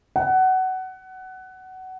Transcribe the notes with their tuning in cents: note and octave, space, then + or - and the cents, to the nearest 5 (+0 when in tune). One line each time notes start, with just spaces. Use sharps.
F#5 +20